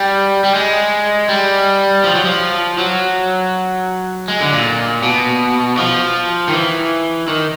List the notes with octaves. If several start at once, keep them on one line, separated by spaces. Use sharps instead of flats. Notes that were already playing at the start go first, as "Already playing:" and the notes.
Already playing: G3
G3
G#3
G3
F3
F#3
F3
F#3
G#3
D3
A#2
B2
F3
D#3
E3
D#3